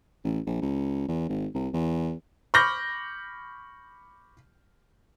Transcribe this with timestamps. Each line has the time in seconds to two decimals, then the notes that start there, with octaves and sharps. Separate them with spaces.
0.24 A1
0.46 A#1
0.61 C#2
1.08 E2
1.28 G#1
1.54 C2
1.74 E2
2.54 B5 C#6 D6 F6 G6 A#6